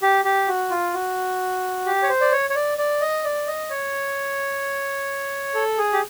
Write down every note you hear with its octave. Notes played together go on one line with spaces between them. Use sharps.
G4
G4
F#4
F4
F#4
G4
C#5
C5
D5
C#5
C#5
D5
D5
D#5
D5
D#5
C#5
A4
G#4
G4